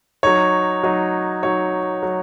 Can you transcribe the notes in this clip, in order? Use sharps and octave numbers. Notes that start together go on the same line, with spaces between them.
F#3 D#4 C#5
F#3 D#4
F#3 D#4 C#5
F#3